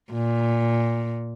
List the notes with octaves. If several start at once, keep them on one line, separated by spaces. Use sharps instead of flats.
A#2